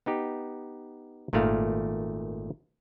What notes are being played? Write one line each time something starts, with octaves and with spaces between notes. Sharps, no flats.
B3 D#4 G4
G#1 A#2 D#3 A3 F5